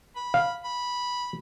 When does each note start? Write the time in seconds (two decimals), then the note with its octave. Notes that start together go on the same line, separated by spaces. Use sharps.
0.16 B5
0.34 F5
0.64 B5